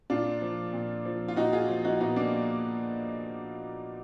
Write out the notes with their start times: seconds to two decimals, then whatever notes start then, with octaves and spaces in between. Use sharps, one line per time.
0.10 A#2 D4 F4
0.42 F3
0.73 A#2
1.05 F3
1.28 F4
1.36 A#2 D#4 F#4
1.52 F4 G#4
1.69 F3
1.84 D#4 F#4
1.95 F4
2.00 A#2 B3 D#4
2.16 A#3 D4